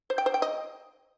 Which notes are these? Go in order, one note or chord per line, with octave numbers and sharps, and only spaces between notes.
C5
G5
C5
G5
D#5